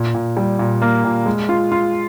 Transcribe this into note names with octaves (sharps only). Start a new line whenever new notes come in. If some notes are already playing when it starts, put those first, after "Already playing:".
Already playing: A#2
A#2
G3
A#2
A#3
A#2
G#3
F4
F4